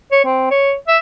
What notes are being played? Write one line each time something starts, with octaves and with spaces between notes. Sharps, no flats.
C#5
C4
C#5
E5